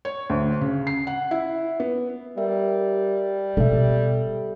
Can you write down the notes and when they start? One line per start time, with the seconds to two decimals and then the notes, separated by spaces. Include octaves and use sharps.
0.05 C#5
0.30 D2
0.61 C#3
0.87 C7
1.07 F#5
1.31 E4
1.80 B3
2.38 G3 A#4 E5
3.57 B2 A4 E5